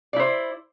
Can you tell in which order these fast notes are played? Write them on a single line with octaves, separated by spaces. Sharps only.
D5 E4 C5